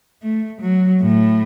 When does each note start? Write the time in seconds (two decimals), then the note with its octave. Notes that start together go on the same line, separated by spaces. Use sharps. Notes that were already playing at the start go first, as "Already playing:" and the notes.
0.22 A3
0.62 F#3
1.02 A2